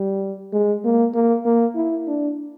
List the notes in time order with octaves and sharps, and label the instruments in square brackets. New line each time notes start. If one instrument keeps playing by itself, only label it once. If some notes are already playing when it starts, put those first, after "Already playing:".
Already playing: [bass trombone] G3
G#3
A#3
A#3
A#3
E4
D4